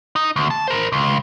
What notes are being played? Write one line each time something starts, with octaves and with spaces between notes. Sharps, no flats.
D#4
D2
A5
A#4 C5
C#2